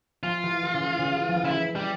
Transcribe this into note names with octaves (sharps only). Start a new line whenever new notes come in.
F3 F4
E3
E3
C#3
E3
C#3
E3
F3
E3
C#3 E4
E3
G3